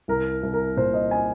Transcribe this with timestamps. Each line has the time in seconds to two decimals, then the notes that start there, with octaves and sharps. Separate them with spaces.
0.08 C2 A#4
0.43 C2
0.54 A#4
0.77 A#2 C5
0.93 D#5
1.11 G#5